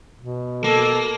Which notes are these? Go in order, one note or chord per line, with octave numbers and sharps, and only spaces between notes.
B2
A#3 A4